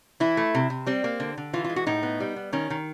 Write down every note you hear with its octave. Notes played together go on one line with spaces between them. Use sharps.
E3 E4
A3
C3
C3
G3 C4
A#3
D3
D3
E3 F4
F4
G#3
F#4
A2 D#4
B3
G3
B3
D#3 C#4
D#3